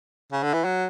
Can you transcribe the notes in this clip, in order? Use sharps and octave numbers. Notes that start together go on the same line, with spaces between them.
C#3
D3
E3
F#3